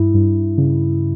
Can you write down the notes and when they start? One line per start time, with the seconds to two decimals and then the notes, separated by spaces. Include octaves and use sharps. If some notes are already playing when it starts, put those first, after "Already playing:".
Already playing: G2 E4
0.14 G2
0.58 C#3